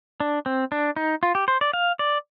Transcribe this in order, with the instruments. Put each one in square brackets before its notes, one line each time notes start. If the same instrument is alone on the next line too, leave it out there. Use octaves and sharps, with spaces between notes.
[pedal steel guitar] D4
C4
D4
D#4
F4
G4
C5
D5
F5
D5